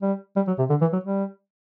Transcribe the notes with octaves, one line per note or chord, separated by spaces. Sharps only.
G3
G3
F#3
C3
D3
E3
F#3
G3